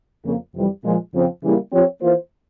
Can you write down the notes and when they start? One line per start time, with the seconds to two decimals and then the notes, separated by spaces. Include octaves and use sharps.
0.25 F2 C#3 F3 A#3
0.54 F2 C3 E3 G3
0.84 A#2 F3 G#3
1.13 F2 C#3 F3 C4
1.43 C#3 E3 G3 A#3 E4
1.72 F3 C4 G4 C#5
2.02 E3 A#3 F4 C5